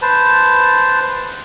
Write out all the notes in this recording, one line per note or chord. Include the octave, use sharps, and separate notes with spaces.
B4 C5 A5